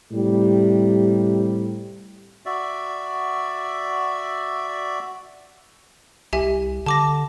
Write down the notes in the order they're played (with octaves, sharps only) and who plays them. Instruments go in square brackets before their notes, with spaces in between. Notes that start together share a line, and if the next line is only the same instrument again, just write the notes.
[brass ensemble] A2 C3 G3
[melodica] F#4 D5 E5
[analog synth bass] C2 [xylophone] G4 E5 G#5
[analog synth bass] D3 [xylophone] A5 D6 A#6